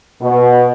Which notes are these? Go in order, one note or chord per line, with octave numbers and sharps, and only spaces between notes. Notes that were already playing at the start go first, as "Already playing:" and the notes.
B2